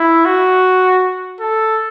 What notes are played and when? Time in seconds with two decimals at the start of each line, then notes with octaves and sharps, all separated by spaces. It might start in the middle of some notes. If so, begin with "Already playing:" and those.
Already playing: E4
0.25 F#4
1.40 A4